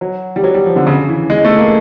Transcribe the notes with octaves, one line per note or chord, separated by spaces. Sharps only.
F#3
G3
F#3
G3
F3
D3
C#3
E3
G#3
A3
A#3